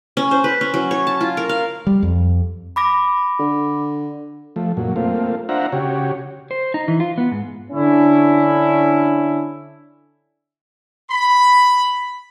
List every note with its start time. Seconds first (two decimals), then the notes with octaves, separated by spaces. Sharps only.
0.17 C#4
0.31 C5
0.44 B4
0.61 C#4
0.74 F#3
0.91 C#5
1.07 A5
1.21 F4
1.37 A#4
1.49 F5
1.87 G3
2.03 F2
2.76 B5 D6 A#6
3.39 D3
4.56 F3 A3
4.77 F#2 A#2 F#3
4.96 A3 A#3 C4 F4
5.49 D4 F4 C5 E5 F#5 A#5
5.72 C#3 F#4 G4 C#5
6.51 C5
6.74 D#4
6.88 E3
7.00 F4
7.18 B3
7.32 G#2
7.71 D3 C#4 D4 E4
11.10 B5